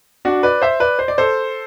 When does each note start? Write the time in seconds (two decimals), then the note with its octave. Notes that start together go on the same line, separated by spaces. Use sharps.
0.25 D4 F#4
0.43 B4 D5
0.62 C5 E5
0.80 B4 D5
0.99 C5
1.08 D5
1.18 A4 C5